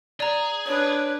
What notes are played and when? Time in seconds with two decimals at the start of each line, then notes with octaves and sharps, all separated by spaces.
0.20 G#4 D5 A#5
0.66 D4 B4 C#5